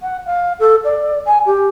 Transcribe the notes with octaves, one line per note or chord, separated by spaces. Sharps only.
F#5
F5
A4
D5
G#5
G4